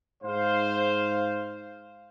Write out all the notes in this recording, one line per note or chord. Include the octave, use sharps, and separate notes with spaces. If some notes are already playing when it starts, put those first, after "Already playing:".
G#2 C5 F5